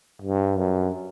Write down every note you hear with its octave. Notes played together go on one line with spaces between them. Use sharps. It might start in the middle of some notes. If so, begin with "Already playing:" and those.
G2
F#2